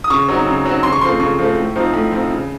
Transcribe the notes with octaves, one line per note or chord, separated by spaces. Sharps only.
D#6
C#3 C#6
F#3 C4 D#4
C#3
F#3 C4 D#4
C#3 C6
C#6
F3 A3 C4 C6
C#3 C#6
F3 A3 C4
A2
F3 C4 D#4
A2
F3 C4 D#4
C#3